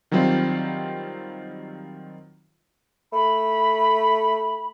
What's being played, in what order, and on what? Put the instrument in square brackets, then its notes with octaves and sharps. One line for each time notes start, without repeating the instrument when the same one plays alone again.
[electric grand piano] D#3 F#3 G3 C4 F4
[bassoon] A3 [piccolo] B5